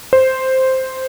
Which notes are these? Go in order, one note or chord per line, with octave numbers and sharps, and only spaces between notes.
C5